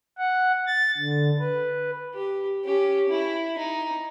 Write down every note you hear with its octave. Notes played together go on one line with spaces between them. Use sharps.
F#5
A6
D3
B4
G4
C#4 G4
E4
D#4